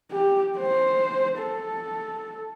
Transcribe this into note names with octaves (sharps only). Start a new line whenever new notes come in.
G4
C5
A4